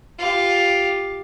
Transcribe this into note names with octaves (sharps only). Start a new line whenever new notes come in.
F4 G4